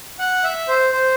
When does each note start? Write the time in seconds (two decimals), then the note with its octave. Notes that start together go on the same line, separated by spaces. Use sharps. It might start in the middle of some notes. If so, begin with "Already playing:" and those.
0.19 F#5
0.44 E5
0.68 C5
0.92 C5